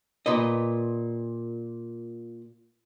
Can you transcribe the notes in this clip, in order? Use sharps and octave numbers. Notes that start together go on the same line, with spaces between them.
A#2 B4 D#5